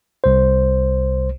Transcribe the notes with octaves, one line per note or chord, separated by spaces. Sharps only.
C2 C5